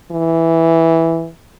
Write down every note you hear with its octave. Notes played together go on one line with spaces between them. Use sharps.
E3